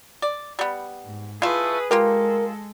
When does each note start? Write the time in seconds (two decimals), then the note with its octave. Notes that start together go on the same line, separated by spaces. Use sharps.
0.22 D5
0.59 G3 B3
1.03 G#2
1.42 A3 E4 F4 G#4 B4 D#6
1.91 G#3 A#3 F4 G4 A4 A#4